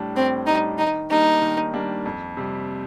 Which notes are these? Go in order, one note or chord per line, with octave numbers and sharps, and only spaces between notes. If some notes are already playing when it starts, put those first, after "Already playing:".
Already playing: A2 G3 D4
A2 C4
G3 D4 D#4
D#3 D#4
G3 A#3 D4 D#4
D#3
G3 A#3 D4
F2
C3 G3